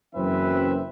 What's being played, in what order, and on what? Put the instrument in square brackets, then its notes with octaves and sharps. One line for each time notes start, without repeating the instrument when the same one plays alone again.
[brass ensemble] F#1 F#2 E3 C4 B4 E5